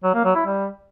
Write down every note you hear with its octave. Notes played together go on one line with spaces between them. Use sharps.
F#3
A#3
F#3
E4
G3